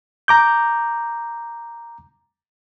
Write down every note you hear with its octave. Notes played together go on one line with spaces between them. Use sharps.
A#5 D6 G6